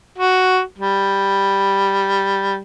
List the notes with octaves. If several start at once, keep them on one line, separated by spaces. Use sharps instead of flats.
F#4
G3